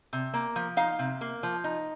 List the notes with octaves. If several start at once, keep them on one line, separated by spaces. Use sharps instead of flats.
C3
A#3
F3
D#4 F5
C3
A#3
F3
D#4